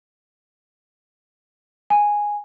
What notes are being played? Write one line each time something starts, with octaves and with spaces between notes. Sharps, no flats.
G#5